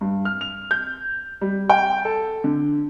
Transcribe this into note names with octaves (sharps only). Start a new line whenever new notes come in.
G2
F6
F7
G6
G3
G5
A4
D3